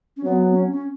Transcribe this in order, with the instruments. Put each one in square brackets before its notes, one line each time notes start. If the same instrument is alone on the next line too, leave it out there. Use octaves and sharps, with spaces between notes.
[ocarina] C#4
[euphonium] F#3 [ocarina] B3
[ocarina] C#4
C#4